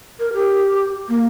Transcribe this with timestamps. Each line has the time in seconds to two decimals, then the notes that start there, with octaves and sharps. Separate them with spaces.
0.19 A#4
0.33 G4
1.08 A#3